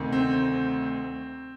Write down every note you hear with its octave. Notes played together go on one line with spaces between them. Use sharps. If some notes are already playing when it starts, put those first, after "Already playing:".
Already playing: D2 C3 D#3
C4